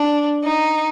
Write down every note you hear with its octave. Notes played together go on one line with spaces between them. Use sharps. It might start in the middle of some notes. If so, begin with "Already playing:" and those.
Already playing: D4
D#4